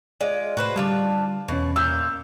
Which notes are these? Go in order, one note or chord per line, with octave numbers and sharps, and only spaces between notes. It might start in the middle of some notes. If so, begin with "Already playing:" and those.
G#3 F4 D5
A2 F#4 B4 C5
D3 G3 D4 F4 A5
E2 B2 C#4
A#2 F5 E6 G6